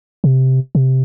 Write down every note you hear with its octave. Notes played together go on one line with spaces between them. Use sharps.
C3
C3